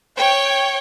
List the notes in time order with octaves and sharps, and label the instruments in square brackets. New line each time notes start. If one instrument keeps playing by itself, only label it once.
[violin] C#5 [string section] G5